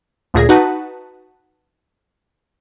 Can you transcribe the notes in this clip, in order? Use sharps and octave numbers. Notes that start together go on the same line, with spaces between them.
D2 A#2 G#4 A#6
D#4 F#4 B4 F#5 A5